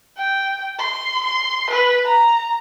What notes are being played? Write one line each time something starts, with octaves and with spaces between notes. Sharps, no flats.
G5
C6
C6
B4
A#5